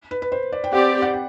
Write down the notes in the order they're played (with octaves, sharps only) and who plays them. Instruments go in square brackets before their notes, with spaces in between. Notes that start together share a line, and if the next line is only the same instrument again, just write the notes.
[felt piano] B4
B4
C5
D5
G5
[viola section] C4 G4 D5 [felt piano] F#5
[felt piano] F#5
G5